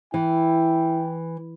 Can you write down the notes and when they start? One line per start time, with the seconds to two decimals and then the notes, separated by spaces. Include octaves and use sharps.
0.14 E3 E4 G5